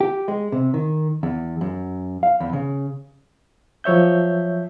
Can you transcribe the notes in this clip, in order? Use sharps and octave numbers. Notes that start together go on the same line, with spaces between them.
G4
G#3
C3
D#3
E2
F#2
F5
E2
C#3
F3 F#3 C#5 E5 G6